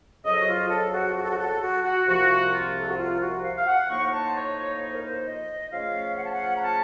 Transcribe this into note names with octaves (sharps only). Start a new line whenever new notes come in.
F2 C#3 F#3 D#5
A4
F#4
F4
A4
F#4
F#4
A4
F#4
A4
F#4
F#4
C2 C3 F3 A#3 F4 F#4
F4
A4
F#4
F4
F#4
F5
F5
F#5
A2 F3 A#3 D#4 C#6
A5
C5
C#5
C#5
C5
A#4
C5
D#5
C#3 F3 A3 C#4 F4 F5
F#5
A5
F#5
A#5
A5